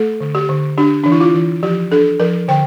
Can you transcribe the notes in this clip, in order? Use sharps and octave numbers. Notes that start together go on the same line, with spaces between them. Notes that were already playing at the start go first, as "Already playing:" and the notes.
Already playing: A3 A4
D3
G4
D3
D4 G4
E3 D4
E4
F4
E3
F3 G4
D4 A4
F3 A#4
D3 G5